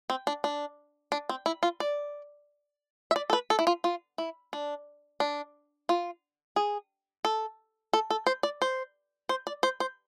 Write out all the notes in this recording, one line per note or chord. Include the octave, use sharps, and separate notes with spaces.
C4
D4
D4
D4
C4
E4
F4
D5
E5
D5
A4
B4
A4
E4
F4
F4
E4
D4
D4
F4
G#4
A4
A4
A4
C5
D5
C5
C5
D5
C5
C5